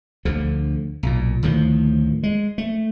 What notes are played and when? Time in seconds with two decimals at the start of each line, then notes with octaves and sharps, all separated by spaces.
0.25 D2 D3 F3
1.03 B1 A#2
1.43 D2 A2 D#3 F3
2.23 G#3
2.58 A3